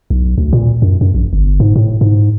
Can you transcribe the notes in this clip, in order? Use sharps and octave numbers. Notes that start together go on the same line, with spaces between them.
B1
D2
A#2
F#2
F#2
A#1
G1
G#2
A2
G#2